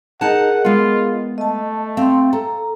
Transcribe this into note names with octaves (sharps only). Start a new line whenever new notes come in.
D#4 G#4 A#4 D#5 F#5 A5
G#3 B3 F4
A3 D#5 A5
C4 F5 C6
A4 A#5